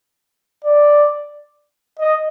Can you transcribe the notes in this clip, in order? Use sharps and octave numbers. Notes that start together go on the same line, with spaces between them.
D5
D#5